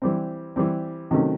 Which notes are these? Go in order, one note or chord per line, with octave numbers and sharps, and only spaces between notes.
E3 G3 C4
E3 G3 C4
C3 D#3 F#3 A3 C#4